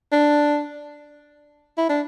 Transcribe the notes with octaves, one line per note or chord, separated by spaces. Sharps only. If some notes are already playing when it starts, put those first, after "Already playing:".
D4
E4
D4